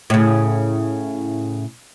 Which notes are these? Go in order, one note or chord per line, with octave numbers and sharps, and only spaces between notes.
A2 C#3